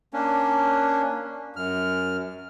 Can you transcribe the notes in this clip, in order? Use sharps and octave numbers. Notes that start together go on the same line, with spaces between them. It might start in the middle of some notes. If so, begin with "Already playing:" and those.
A#3 C#4 D4
F#2 F6